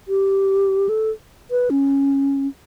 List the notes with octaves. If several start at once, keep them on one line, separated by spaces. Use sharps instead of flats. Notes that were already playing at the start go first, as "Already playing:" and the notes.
G4
A4
B4
C#4